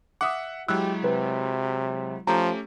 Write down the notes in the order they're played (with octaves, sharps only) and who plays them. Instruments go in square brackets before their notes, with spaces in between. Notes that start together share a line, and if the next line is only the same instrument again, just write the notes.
[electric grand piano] E5 F#5 [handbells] D6 D#6
[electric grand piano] F#3 G#3 E4 [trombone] G4 [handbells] E6 F#6
[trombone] C3 [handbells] B4
[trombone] F3 [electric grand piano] A3 C#4 G4 [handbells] A#5